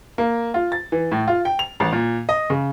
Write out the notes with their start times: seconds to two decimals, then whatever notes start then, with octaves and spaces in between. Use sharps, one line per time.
0.18 A#3
0.54 F4
0.72 A6
0.92 E3
1.12 A2
1.28 F4
1.45 G5
1.59 F7
1.80 A1
1.92 A#2
2.29 D#5
2.50 C#3